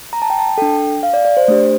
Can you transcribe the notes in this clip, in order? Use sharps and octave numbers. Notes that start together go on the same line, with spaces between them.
A#5
A5
G5
A5
D4 A4 G5
F5
D5
D5
C5
A3 D4 G4 C5